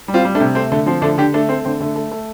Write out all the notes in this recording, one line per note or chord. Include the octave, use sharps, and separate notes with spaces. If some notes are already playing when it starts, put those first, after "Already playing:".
G3
C4 F4
G3
A3 D4
C3
A3 C4
D3 A3
F3 C4
D3 A3 D4
D3 D4 G4
A3 D4
A3 C4
D3 C4
D3 A3
A3
A3